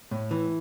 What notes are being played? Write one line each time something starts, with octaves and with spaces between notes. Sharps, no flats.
A2
E3